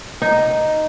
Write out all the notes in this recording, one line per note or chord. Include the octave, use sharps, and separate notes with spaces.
D#4